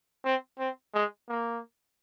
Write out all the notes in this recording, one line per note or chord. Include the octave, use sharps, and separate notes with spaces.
C4
C4
G#3
A#3